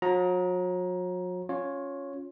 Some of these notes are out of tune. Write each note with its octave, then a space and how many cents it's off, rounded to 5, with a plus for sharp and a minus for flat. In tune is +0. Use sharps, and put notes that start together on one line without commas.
F#3 -40 A#5 +15
C#4 +0 F4 +20 C#5 +0